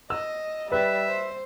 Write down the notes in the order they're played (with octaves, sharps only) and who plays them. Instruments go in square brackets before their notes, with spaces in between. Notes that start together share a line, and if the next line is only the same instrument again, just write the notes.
[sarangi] D#5 [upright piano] E6
[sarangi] G3 [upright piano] B4 [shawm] E5
[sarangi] C5